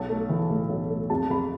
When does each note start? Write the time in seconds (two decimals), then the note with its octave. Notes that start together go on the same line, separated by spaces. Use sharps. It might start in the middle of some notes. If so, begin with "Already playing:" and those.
Already playing: B1 A5
0.10 A3
0.29 E3
0.50 A2
0.69 B1
0.90 A3
1.10 F2 A5
1.30 F2 B5